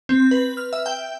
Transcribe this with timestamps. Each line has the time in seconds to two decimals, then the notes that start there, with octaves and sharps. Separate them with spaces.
0.09 C4
0.31 B4
0.57 F6
0.73 E5
0.86 G5